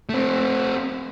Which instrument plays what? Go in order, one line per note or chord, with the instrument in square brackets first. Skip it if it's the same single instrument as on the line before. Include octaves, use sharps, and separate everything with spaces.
[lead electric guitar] A3 C4